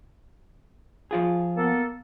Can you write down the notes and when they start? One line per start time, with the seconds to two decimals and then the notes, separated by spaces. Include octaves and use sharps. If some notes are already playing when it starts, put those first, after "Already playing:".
1.11 F3 F4 G#4
1.57 A#3 B3 A4